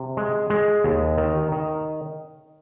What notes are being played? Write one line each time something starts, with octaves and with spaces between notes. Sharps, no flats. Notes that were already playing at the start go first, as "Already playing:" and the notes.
Already playing: C3
G#3
G#3
D#2
D#3
D#3